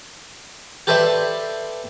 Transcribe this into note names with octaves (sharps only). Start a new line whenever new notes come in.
G4 A4 B4 C5 D5 E5